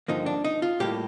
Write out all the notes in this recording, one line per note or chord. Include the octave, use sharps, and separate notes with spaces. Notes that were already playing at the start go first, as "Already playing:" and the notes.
G2 D3 F3 A#3 D#4
D4
D#4
F4
A2 G3 A#3 G4